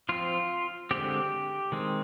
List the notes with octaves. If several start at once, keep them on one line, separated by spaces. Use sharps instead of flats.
F3 C4 F4
D3 G#3 C4 G4
D#3 G#3 C4